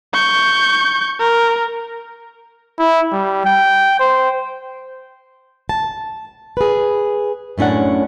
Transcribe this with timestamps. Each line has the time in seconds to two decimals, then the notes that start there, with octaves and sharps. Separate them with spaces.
0.14 C#6 G6
1.20 A#4
2.79 E4
3.12 G3
3.45 G5
4.00 C5
5.69 A5
6.57 G#4 B4
7.58 F#2 A2 C#4 D4 F#5